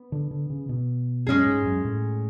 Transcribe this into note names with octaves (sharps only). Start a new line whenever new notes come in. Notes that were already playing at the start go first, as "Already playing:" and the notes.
Already playing: B3
D3
D3
C#3
B2
F#2 G#3 C#4 G#4
G#2
F#2
A2